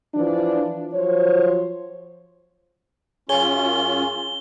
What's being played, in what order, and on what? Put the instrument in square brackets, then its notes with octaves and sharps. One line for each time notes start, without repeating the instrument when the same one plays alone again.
[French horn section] E3 F3 D4
F3 F#3 C5 C#5
[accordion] F#2 C#4 F4 [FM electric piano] G#4 C#5 G#5 [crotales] G7